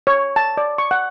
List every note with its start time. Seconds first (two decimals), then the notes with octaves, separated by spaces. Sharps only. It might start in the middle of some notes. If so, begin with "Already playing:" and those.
0.07 C#5
0.36 A5
0.57 D5
0.78 C#6
0.91 F#5